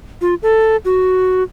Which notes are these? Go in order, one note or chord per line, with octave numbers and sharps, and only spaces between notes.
F4
A4
F#4